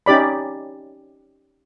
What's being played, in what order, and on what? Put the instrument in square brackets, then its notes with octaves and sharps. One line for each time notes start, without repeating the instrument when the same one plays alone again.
[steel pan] C#4 D#4 G4 D5 B5